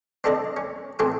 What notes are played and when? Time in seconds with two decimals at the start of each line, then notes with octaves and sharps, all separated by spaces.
0.24 C4 D4 A4 D5 D#5
0.57 C#4
0.99 A1 C4 A4 G#5 D6 D#6